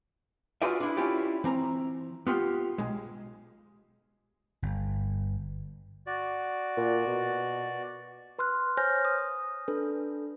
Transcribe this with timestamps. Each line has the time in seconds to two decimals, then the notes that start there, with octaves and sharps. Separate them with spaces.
0.62 F4 F#4 G#4 B4 D5 E5
0.80 D4 E4
0.97 C#4 E4 F4 G4 D5
1.44 E3 C4 A#5
2.27 B3 F4 G4
2.78 B1 G#3
4.62 G1
6.07 F#4 D5
6.77 A#2
7.07 B2
8.39 B4 C6 F6 F#6
8.77 C5 C#5 G#5 F6 G6 A#6
9.05 D#6
9.68 D4 A4 B4